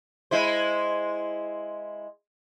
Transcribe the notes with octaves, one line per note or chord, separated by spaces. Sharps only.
G#3 E4 C5